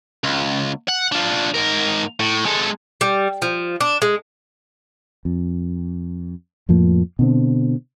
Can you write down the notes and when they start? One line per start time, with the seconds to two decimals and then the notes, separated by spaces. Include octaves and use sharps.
0.24 C#2
0.88 F#5
1.12 D4 F4
1.56 G#2 A#4
2.20 A2
2.45 G#3 A4
3.01 G3
3.42 F3
3.81 D4
4.02 G#3
5.25 F2
6.69 F2 A2 F3 A#3
7.19 B2 D3 C4